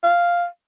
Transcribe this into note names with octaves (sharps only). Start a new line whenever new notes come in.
F5